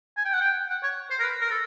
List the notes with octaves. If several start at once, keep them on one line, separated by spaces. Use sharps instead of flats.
G#5
G5
F#5
G5
F#5
C#5
C5
A#4
B4
A#4
A4